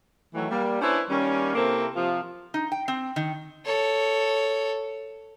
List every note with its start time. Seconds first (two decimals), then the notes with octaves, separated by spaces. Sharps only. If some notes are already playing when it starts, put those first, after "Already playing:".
0.34 D#3 E3 F#3 A3
0.51 G3 A#3
0.81 C#4 D4 E4 B4 C5
1.10 D#3 G3 A#3 C#4
1.55 C3 A#3 C4 E4 A4 A#4
1.95 C3 F3 F4
2.54 D#4
2.72 G5
2.88 C4
3.16 D#3
3.65 A4 C#5